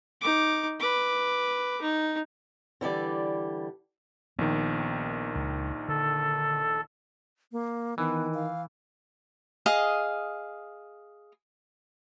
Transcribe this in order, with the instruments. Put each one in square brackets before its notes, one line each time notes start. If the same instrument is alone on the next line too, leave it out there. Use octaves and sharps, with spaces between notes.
[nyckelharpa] D#4 D6
B4 D6
D#4
[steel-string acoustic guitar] D3 E3 G3 D5
[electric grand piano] A#1 D#3 [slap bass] B3
[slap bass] C#2
[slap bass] D3 [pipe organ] A4
[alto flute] A#3
[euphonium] D#3 [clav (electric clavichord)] E3 [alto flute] B3
[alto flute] F5
[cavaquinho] G#4 D#5 F5